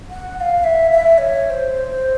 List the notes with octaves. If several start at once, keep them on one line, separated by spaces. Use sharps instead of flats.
F#5
F#5
F5
E5
E5
C#5
C#5
C5